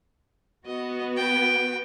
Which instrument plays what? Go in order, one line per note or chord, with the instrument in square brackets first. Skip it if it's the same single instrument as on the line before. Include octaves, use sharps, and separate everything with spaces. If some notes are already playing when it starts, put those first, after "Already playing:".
[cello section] B3 F#4 [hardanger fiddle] D#5
[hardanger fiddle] B4 G5